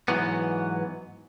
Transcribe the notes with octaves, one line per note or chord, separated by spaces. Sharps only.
G#2 E3 F#3 B3